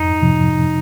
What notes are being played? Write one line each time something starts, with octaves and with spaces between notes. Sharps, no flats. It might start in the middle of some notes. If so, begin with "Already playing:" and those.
Already playing: F2 D#4
C3 F3